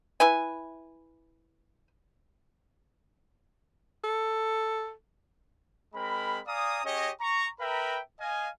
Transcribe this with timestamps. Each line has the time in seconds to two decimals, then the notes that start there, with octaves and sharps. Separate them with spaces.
0.20 E4 B4 G#5
4.04 A4
5.94 G#3 C4 A#4 B5
6.47 D5 F5 G#5 A#5 D#6
6.84 C#4 G4 G#4 C#5 D#5
7.21 A#5 C#6
7.60 A#4 B4 E5 G5 A#5 B5
8.19 D#5 F5 G#5